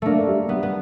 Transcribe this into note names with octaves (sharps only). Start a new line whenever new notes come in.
A3 A#3 D4
G3
G3 B3
B3